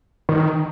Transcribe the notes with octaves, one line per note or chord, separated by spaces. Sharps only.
D#3